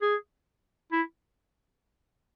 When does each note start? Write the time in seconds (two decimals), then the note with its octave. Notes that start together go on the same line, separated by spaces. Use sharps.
0.02 G#4
0.92 E4